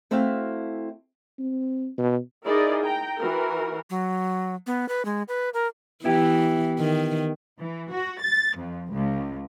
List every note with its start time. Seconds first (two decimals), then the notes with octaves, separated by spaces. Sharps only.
0.11 A3 C4 E4 F#4 E5 F5
1.39 C4
1.98 B2
2.44 D#4 E4 G#4 A#4 D5 D#5
2.83 G5 A#5
3.18 E3 F#4 A#4
3.90 F#3
4.67 B3
4.89 B4
5.05 G#3
5.28 B4
5.54 A#4
6.04 E3 B3 E4 G4
6.80 D#3
7.60 E3
7.92 F#4
8.21 A6
8.58 F2
8.92 C#2